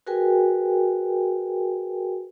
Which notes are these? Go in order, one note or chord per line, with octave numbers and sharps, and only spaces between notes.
F#4 G#4 A#4 B4 G5 G#5